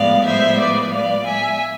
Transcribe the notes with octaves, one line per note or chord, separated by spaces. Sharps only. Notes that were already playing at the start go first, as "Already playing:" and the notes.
Already playing: A2 F3 G#3 B3 D5 F5
C5 E5
B4 D5
D5 F5
E5 G#5